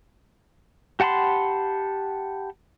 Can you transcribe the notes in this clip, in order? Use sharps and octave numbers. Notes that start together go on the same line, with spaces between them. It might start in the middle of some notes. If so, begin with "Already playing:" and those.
G4 F#5 A5 B5 C6